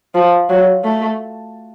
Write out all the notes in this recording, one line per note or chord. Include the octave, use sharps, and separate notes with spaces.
F3
F#3
A3